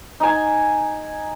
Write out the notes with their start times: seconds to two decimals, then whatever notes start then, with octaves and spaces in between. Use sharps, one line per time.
0.20 D#4 G#5